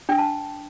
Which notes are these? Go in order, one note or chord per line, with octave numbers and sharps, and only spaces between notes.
D4 G5
A5